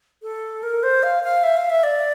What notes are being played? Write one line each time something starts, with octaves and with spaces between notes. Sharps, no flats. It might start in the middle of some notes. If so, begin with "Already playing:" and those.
A4
A#4
C5
F5
F5
E5
F5
E5
D5